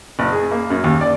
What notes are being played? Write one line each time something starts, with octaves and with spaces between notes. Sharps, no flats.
F#1
G#4
A#3
F#2
D#2
D5